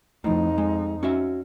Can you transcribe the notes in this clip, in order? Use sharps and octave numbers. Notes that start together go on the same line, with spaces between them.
F2 A2 F3 D#4
G#3
C#4 F#4 E5